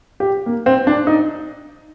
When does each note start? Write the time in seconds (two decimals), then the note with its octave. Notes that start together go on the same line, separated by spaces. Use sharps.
0.20 G4
0.46 A#3
0.66 C4
0.87 D4
1.07 D#4